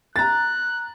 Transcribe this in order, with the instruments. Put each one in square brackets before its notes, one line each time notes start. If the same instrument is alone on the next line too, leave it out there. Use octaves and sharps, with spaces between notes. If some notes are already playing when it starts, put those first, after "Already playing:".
[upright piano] A#5 A6 [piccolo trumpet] F#6